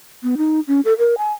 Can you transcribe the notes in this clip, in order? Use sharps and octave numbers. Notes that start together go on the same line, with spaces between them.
B3
D#4
C#4
A4
A#4
G#5